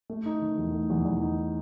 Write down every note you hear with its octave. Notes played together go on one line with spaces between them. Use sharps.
A3
D#4
D#3
E2
A3
E2
E2
D#4